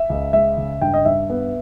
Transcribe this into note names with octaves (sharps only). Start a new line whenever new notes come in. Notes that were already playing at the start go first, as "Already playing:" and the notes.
Already playing: E5
C#2
G#3 E5
C#3
G2 G5
D#5
G2 E5
B3